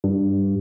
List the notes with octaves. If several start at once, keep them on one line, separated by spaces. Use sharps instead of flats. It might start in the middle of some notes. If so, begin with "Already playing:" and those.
G2